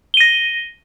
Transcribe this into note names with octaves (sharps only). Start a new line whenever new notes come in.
A#6 D#7 G7